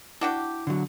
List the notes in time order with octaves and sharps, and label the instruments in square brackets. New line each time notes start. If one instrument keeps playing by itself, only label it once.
[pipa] D4 F#4 G4 [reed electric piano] E4
[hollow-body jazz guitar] D3 F#3